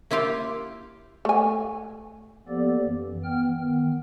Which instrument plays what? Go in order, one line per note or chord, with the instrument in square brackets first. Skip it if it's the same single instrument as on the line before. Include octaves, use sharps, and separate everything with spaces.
[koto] A#3 E4 F4 G4 F5
[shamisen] A3 G#5
[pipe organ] F3 A#3 B3 G4 A4 D5
F#2 E3
E3 B3 G5 F6
D#3 B3